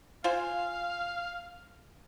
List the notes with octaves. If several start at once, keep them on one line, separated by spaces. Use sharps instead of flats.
F4 C5 F5 G#5